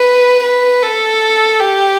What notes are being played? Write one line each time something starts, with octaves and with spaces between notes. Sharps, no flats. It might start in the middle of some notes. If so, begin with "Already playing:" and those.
Already playing: B4
B4
A4
G4